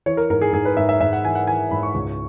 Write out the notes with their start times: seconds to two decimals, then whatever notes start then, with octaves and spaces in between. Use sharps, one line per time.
0.06 E3 C#5
0.17 A#4
0.30 G#2 A#4
0.41 G#4
0.53 G#2 G#4
0.65 B4
0.77 G#2 E5
0.89 E5
1.01 G#2 E5
1.13 F#5
1.25 E3 G#5
1.35 F#5
1.47 E3 G#5
1.71 G#2 B5
1.83 C#6
1.94 C#2 C#6